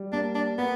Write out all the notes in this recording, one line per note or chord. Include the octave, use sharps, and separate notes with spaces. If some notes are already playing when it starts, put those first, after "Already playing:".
Already playing: G3
A#3 D4
D4
A#3 B3